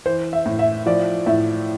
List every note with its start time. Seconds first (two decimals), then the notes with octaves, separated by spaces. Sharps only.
0.06 E3 C5
0.33 E5
0.46 A2
0.59 E5
0.86 F3 D5
1.26 A2 E5